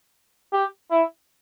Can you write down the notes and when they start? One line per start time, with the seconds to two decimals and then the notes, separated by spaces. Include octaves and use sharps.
0.53 G4
0.91 E4